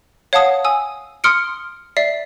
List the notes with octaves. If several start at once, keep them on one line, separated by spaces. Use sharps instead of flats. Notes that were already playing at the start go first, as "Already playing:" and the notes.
C#5 F5 F#5 A5 D#6
G#5 D#6 E6
C6 D#6 F6 C#7 D7
D5 E5 C7